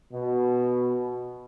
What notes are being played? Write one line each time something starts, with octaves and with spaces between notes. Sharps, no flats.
B2